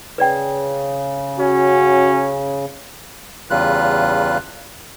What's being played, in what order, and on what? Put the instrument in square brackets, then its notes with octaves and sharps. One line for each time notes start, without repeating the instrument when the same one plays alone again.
[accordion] C#3 [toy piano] B4 D5 G5
[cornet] C#4 [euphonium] F#4
[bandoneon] E2 C#3 G3 F4 B4 F#6